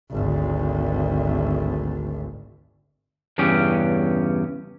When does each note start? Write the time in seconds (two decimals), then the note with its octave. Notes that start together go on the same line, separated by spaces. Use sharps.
0.11 G#1 D2
3.38 E2 G2 C#3 C#4 G4